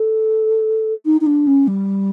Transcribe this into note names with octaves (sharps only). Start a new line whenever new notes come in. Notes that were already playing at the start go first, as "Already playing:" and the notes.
Already playing: A4
D#4
D#4
D4
C#4
G3